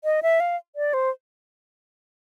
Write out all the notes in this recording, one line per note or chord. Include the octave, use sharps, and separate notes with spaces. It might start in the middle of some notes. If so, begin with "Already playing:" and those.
D#5
E5
F5
D5
C5